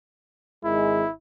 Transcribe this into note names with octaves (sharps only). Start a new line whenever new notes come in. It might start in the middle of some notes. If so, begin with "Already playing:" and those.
G#1 D#3 G#3 E4